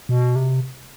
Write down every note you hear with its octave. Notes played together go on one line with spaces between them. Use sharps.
B2
C3